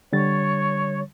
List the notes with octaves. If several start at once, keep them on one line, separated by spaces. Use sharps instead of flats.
D3 G3 C#5 A6